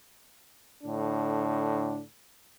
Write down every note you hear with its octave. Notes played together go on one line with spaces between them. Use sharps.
A2 D3 D4